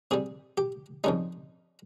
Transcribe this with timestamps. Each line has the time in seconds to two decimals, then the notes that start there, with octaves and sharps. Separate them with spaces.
0.11 C3 G3 G#4
0.58 G4
1.04 F2 C#3 G3 D#4